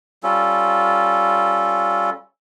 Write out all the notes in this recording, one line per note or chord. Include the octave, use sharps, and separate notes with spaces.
G3 C#4 F4 A4